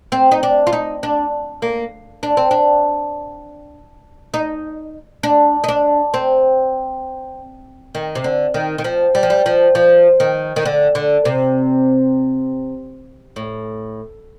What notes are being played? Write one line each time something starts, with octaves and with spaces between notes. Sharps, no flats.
C4
D#4
D4
F4
D#4
D4
A#3
D4
C4
D4
D#4
D4
D#4
D4
C4
D#3
C3
D3
D#3
D#3
F3
G3
F3
G3
F3
F3
D#3
D#3
D3
D3
C3
A2